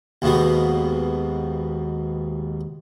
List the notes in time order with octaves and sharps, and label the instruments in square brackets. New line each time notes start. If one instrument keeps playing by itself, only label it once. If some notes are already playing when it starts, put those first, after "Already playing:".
[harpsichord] D#2 G#2 B2 B3